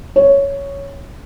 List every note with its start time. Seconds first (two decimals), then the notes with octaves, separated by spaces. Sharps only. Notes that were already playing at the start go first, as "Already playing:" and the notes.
0.16 C#5